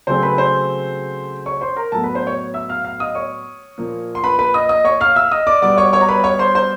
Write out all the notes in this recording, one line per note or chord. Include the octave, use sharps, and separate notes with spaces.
C#3 F#3 A3 C4 C5 C6
B4 B5
C5 C6
C#5 C#6
C5 C6
A#4 A#5
A2 F#3 B3 A4 A5
B4 B5
C5 C6
C#5 C#6
E5 E6
F5 F6
F5 F6
D#5 D#6
C#5 C#6
A#2 F3 A#3
C6
B4 B5
B4 B5
D#5 D#6
D#5 D#6
C#5 C#6
F5 F6
E5 E6
D#5 D#6
D5 D6
B2 G3 B3 D5 D6
C#5 C#6
C#5 C#6
A#5
B4 B5
C#5 C#6
C5 C6
C5 C6